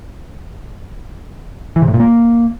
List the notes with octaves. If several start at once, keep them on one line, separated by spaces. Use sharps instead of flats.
E3
C3
A2
A#2
A#3